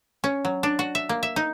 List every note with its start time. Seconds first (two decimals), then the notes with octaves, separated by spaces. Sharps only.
0.24 C#4
0.45 F#3
0.63 D4
0.79 F#4
0.95 E5
1.09 A#3
1.23 E5
1.36 D#4